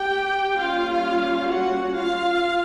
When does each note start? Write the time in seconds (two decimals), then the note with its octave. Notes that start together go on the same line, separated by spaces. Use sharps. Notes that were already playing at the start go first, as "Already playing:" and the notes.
Already playing: G4 G5
0.57 G3 A#3 C#4 F4 F5
1.48 F#4 F#5
1.94 F4 F5